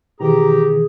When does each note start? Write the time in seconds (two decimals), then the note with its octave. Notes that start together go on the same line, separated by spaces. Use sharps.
0.20 B2 D#3 E3 G4 G#4 A#5